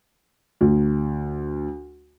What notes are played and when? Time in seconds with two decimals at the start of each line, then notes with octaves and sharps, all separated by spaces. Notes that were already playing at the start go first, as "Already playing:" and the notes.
0.61 D2